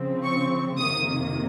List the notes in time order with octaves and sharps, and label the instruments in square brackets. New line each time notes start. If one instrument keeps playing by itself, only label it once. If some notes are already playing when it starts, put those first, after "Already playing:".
Already playing: [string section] C#3 F3 C4
C#6
F2 C3 D#3 A#3 D#6